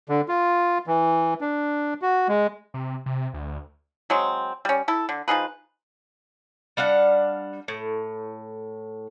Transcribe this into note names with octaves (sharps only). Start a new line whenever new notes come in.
D3
F4
E3
D4
F#4
G#3
C3
C3
D2
F#3 G#3 C4
G3 C#4
E4 A4
D3
F3 D#4 G#4 B4
G3 D4 F5 F#5
A2